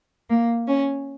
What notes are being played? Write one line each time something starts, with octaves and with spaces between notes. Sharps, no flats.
A#3
C#4